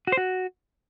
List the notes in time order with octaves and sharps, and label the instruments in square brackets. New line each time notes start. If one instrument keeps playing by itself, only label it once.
[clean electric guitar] F#4
C5
F#4